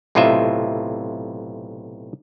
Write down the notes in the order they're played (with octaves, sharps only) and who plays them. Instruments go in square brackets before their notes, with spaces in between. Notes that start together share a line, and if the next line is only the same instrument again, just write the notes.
[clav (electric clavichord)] B1 A2 C3 F4 D#5 E5